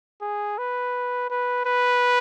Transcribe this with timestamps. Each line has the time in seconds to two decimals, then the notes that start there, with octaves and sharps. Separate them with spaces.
0.22 G#4
0.58 B4
1.30 B4
1.66 B4